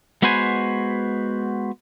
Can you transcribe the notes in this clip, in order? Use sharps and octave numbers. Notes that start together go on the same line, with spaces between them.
G#3 B3 F#4 B4 C5 G#5